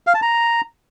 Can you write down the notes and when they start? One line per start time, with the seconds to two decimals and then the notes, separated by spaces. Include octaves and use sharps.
0.07 F5
0.14 A5
0.22 A#5